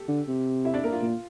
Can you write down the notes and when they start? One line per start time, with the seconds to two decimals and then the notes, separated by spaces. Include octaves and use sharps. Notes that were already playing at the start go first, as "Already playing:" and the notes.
Already playing: G4 A4
0.08 D3
0.28 C3
0.65 E4 E5
0.74 D4 D5
0.84 A#3 A#4
0.92 F4
1.02 A#2